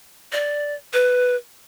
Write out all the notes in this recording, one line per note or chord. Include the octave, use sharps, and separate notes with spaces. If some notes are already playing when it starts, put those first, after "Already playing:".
D5
B4